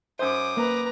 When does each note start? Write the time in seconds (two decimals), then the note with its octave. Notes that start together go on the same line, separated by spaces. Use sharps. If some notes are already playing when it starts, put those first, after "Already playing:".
0.19 F#2 C5 D6 D#6
0.57 A#3 B4 A#5